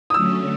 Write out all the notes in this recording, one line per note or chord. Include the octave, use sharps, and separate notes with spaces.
D#6
D3 F#3 A3 C#4 E6